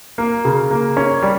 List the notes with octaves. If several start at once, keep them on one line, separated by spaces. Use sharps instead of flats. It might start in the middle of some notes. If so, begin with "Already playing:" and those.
A#3
C#3
A#3
C#4
G3